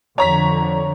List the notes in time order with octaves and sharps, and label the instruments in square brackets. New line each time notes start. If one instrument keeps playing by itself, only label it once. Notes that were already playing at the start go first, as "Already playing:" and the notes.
[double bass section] F2 D3 [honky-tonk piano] C#5 A#5 B6